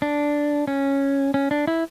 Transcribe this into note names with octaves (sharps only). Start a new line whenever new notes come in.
D4
C#4
C#4
D4
E4